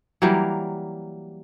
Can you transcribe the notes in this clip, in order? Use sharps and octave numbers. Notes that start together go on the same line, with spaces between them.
E3 F#3 G3 A#3